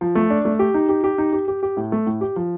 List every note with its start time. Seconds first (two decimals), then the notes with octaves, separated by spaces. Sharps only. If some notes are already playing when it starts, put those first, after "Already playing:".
0.01 F3
0.15 A3
0.30 D4
0.45 A3
0.59 G4
0.74 D#4
0.89 G4
1.04 G4
1.18 D#4
1.33 G4
1.48 G4
1.63 G4
1.77 A2
1.92 A3
2.06 A2
2.21 G4
2.36 F3